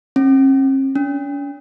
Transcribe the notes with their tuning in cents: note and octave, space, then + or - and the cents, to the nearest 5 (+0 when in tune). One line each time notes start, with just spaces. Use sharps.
C#4 -45
C#4 +45